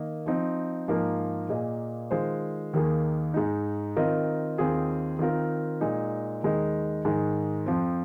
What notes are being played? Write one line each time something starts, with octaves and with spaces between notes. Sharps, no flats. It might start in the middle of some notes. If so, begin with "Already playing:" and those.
Already playing: D#3 A#3 D#5
F3 C4 D#4
G#2 F3 A#3 D#4 A#4
A#2 A#3 G#4 D#5
D#3 G#3 F4 C5
D#2 D#3 A#3 G#4
G#2 G#3 D#4
D#3 C4 F4 A#4 D#5
D#2 D#3 C4 F4 G#4
D#3 C4 F4 A#4
A#2 G#3 D#4
D#2 D#3 G#3 D#4
G#2 D#3 G#3
F2 F3 C4